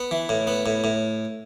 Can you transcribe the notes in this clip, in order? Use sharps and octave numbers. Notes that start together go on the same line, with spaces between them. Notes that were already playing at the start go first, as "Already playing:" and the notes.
Already playing: B3
E3
A2
B3
A2
A2